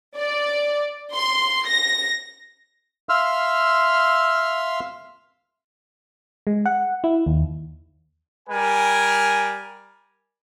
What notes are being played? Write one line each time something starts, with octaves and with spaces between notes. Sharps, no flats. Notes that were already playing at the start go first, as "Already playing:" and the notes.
D5
C6
A#6
E5 F5 C6 E6 F6
G#3
F#5
E4
D#2
G3 A#4 G#5